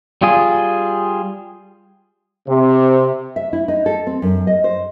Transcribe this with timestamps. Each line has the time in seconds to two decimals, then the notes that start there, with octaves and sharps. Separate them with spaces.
0.22 G3 F4 G#4
2.48 C3
3.36 E5
3.53 E4
3.68 D#4
3.86 A4
4.07 C4
4.22 F#2
4.47 D#5
4.64 C5